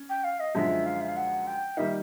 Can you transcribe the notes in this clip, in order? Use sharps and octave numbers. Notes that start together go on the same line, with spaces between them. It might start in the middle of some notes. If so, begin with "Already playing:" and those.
Already playing: C#4
G5
F5
D#5
F#2 D3 F3 G#3 E5
F5
E5
F5
F#5
G5
D#3 G3 A#3 D#4 E5